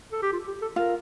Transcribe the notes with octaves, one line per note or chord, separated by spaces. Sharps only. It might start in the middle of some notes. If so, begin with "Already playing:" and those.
A4
G4
F4
G4
A4
F4 A#4